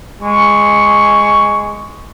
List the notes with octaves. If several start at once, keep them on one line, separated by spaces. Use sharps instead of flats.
G#3 C#6